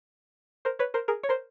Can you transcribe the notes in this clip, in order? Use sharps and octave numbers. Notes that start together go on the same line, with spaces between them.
A#4 C5
B4 C#5
A#4 C5
G#4 A#4
C#5
A#4 C5